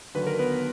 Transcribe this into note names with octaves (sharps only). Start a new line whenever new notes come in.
D#2 D3 F#3 B4
A#4
B3 B4